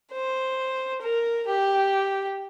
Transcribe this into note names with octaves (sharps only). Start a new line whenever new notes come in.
C5
A#4
G4